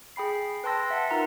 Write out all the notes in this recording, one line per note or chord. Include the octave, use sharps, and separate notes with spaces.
G#4 G5 B5 C7
B4 G5 A5 C6 E6 A#6
E5 F#5 A5
D#4 F4 A#4 F#5 A#5